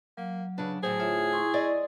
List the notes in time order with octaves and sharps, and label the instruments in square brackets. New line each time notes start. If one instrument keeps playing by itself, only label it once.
[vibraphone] F#3 [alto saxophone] A#3
[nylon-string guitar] C#3 D4 [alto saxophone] B4
[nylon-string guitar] D2 A2 C5 [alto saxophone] G#4
[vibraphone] F4 C#5 E5
E4 C6 C#6
[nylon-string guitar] D5 D#5